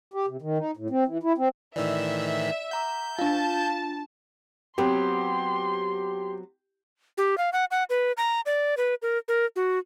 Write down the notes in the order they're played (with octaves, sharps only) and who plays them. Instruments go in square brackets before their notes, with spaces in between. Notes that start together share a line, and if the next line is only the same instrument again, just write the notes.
[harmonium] G4
C3
D#3
D#4
A2
C4
E3
E4
C4
[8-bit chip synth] A2 D#3 E3 [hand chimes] D5 E6 [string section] E5
[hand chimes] F#5 A#5 D6 [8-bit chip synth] G6
[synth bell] D4 F4 [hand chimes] F5 [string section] A5
[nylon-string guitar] F#3 B3 C4 [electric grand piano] G4 [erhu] C6
[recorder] G4
F5
F#5
F#5
B4
A#5
D5
B4
A#4
A#4
F#4